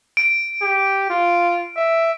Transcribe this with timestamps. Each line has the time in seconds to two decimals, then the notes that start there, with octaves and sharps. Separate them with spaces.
0.17 D7
0.62 G4
1.10 F4
1.77 E5